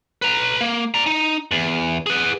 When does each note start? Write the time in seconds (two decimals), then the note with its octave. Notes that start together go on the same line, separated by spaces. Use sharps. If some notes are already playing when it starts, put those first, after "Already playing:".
0.22 B4 A#5
0.61 A#3
0.94 D5 A#5
1.06 D#4
1.51 E2
2.06 G#4 B4